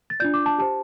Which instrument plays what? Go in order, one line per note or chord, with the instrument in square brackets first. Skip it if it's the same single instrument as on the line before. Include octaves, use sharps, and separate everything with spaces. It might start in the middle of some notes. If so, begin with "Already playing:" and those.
[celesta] A6
D4 F4 D5 G6
D6
A5
G4 C5 A5